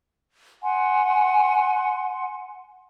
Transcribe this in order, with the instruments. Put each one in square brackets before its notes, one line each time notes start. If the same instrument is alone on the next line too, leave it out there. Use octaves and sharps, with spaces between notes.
[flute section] F#5 G#5 C6